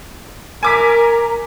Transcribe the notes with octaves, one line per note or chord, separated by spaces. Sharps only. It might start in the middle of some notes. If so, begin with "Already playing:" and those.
A#4 G#5 D6 B6